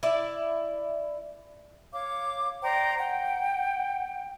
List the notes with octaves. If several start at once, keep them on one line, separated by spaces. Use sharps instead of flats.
E4 D5
C#5 F5 D6
C5 D5 G5 A#5
F#5 G5